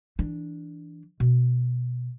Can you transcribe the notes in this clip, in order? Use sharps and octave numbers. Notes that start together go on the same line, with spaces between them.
E3 D4
B2